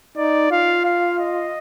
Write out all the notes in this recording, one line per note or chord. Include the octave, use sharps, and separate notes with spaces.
D#4 D5
F4 F5
F5
D#5